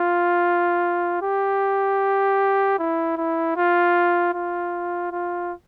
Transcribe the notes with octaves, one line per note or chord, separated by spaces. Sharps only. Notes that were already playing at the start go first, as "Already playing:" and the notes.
Already playing: F4
G4
E4
E4
F4
F4
F4